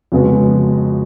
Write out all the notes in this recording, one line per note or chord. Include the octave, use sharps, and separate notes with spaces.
F2 C#3 G#3 B3 F#4